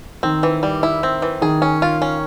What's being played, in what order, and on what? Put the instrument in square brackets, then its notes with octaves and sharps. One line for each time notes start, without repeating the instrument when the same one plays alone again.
[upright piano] D#3 [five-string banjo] C4
[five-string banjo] E3
G3
E4
C4
E3
[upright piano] D#3 [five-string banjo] G#4
[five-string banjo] C#4
F4
C#4